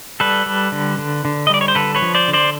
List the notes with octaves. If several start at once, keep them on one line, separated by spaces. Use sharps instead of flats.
G3 A4 B4
G3
D3
D3
D3
D#5
G3 D5
C#5
C5
D3 A4 B4
B4 C#5
F3
C5 D5
D3
C5 D5